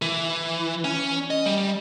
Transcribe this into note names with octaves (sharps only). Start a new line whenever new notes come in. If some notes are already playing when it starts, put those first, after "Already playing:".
E3
C#4
D#5
G3